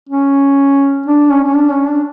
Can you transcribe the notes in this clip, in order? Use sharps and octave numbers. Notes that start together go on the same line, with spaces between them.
C#4
D4
C#4
C#4
D4
C#4
D4